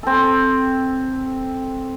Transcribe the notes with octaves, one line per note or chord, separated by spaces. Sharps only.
C4 A4